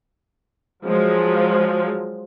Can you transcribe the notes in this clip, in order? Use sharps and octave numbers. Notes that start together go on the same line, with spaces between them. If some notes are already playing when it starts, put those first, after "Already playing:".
F3 F#3 G#3